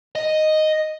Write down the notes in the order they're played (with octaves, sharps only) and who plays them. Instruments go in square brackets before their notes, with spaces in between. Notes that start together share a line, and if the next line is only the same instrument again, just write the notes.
[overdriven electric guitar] D#5